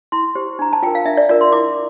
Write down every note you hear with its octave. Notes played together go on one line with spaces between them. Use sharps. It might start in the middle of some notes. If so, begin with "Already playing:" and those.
E4 C6
G4 C5
D4 A#5
A5
F4 A#4 G5
F5
D4 E5
D5
F4 A#4 D5
C6
E4 D6